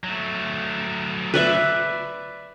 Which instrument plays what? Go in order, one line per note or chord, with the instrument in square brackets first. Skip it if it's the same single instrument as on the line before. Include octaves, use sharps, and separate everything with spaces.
[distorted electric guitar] F#3 A3
[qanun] B4 D5 E5